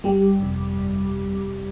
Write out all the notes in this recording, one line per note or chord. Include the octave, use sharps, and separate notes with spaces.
G1 G3 G4
F2 C3
G1